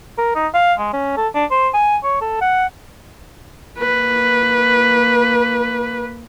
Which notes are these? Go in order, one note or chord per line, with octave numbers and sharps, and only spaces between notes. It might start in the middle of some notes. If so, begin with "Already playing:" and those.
A#4
D#4
F5
G#3
C#4
A4
D4
C5
G#5
C#5
A4
F#5
A#3 B4